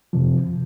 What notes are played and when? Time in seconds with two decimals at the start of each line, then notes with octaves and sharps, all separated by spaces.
0.13 F2 C3 F3